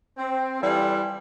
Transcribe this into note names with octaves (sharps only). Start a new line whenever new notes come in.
C4
E3 G3 F4 A4